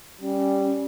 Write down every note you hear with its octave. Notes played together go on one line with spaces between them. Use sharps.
G3 C#4